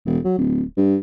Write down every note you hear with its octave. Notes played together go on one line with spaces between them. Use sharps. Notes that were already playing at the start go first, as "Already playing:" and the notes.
E1
F#3
D1
G2